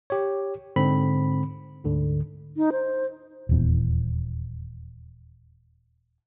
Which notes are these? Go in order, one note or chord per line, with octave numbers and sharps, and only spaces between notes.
G4 C#5
G#2 D3 C4 B5
D2 G#2 D3
D#4
C5
D#1 E2